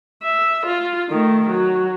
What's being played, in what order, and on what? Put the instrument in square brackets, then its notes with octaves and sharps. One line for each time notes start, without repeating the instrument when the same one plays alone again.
[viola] E5
F4
D#3 A3
F#3